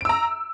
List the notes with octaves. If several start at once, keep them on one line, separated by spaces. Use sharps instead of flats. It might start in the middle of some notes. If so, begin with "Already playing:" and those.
A#5 E6 D7